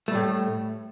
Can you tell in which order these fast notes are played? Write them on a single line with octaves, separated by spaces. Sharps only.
A3 G3 A2